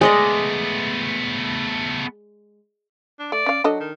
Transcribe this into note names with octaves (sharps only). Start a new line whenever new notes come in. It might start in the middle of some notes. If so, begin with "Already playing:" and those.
G#3 A3 B3 D5 D#5
D4
A3 D5
C#4 F5
F#3 D4 A4 D#5
D#3